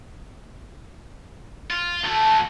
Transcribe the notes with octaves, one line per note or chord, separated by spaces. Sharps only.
F4
A3 F#4 A5